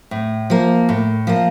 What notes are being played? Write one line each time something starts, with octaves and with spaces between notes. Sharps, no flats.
A2
F3 A#3
A2
F3 A#3